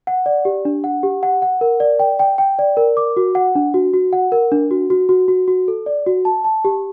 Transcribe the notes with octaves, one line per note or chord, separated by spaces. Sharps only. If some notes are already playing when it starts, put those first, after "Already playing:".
F#5
D5
G4
D4
F#5
G4
F#5
F#5
A#4
D5
G5
G5
G5
D5
A#4
D6
F#4
F#5
D4
F#4
F#4
F#5
A#4
D4
F#4
F#4
F#4
F#4
F#4
A4
D5
F#4
A5
A5
G4